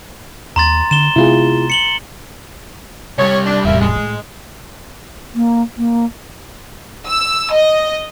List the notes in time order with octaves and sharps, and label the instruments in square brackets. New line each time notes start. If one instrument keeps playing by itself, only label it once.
[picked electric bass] D#2 [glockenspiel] A#5 C6 A6
[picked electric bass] D3 [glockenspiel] E7 G7
[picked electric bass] C3 G#3 B3 [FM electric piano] E4 F4 G#4
[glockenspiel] C#7 F#7 G7
[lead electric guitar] C2 G3 [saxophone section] C#5
[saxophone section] D4
[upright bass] E1 A1 [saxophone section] A#3 E5
[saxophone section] G#3
[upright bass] A2
[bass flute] A#3
A#3
[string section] E6
D#5